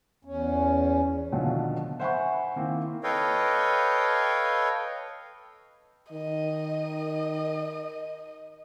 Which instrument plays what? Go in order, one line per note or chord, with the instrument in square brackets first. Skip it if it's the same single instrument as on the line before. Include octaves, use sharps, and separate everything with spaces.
[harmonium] E2 C#4
[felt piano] B2 D3 D#3 F3 F#3
C5 E5 F#5 G#5 B5 C#6
D#3 A#3 C4 E4
[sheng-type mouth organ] A4 B4 C#5 D#5 F5 G5
[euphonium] D#3 [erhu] D#5